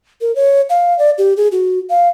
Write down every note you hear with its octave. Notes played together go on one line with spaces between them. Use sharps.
A#4
C#5
F5
D5
G4
G#4
F#4
F5